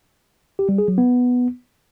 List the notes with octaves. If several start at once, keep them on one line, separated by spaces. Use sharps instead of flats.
G4
G3
G#4
F#3
B3